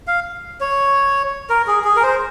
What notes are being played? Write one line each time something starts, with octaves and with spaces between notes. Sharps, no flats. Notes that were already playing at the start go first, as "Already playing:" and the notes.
F5
C#5
A#4
G#4
G#4
A#4
C5